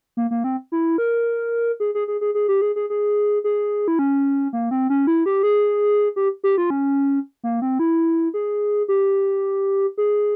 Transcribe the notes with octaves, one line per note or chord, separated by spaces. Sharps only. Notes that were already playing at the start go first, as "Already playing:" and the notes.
A#3
A#3
C4
E4
A#4
G#4
G#4
G#4
G#4
G#4
G4
G#4
G#4
G#4
G#4
E4
C#4
A#3
C4
C#4
E4
G4
G#4
G4
G4
F4
C#4
A#3
C4
E4
G#4
G4
G#4